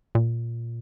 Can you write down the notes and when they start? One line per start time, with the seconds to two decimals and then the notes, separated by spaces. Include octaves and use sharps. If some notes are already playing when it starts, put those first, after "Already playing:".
0.15 A#2